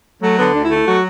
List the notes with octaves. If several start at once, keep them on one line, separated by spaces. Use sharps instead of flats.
F#3 A3
D3 B3
D2 D4
E4
A3
E4
F#3 F#4